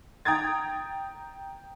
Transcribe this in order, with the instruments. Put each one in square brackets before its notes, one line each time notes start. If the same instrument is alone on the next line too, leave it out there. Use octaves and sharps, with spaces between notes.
[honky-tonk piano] G5 A#5 D#6 G#6 A6